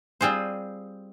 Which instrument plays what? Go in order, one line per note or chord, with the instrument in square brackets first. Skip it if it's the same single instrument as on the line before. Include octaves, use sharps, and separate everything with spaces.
[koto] G3 C4 F4 G#4 C5